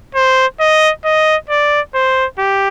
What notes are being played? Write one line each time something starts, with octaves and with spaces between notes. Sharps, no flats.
C5
D#5
D#5
D5
C5
G4